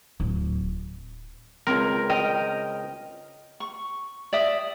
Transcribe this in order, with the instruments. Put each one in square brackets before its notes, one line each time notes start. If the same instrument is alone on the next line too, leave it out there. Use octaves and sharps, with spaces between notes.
[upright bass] D1
[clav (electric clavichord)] C#2 A#4 [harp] C4
[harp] D#5 G5 F6
[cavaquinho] C#6
D5 E5 D#6